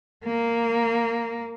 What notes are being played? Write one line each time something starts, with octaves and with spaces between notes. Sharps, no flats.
A#3